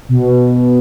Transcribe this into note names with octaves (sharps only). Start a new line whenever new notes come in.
B2